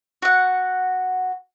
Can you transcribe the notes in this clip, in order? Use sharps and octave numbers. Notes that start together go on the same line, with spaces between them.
F#4 F#5